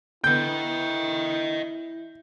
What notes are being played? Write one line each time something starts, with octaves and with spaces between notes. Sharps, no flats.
D3 B3 E4 D#5 G5 G6